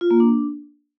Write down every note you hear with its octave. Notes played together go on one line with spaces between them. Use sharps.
F4
A#3
D4